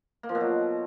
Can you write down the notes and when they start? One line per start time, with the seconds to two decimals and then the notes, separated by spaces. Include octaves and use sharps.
0.23 A#3
0.29 F3
0.35 B2
0.41 F#3